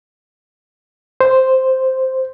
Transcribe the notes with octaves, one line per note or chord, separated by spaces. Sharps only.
C5